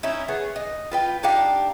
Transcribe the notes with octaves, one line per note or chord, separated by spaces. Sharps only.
C#4 D#4 E4
B3 G#4 C#5
D#4
F4 B4 G5
D4 D#4 G4 F5